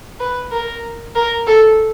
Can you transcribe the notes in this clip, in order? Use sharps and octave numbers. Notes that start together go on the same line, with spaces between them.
B4
A#4
A#4
A4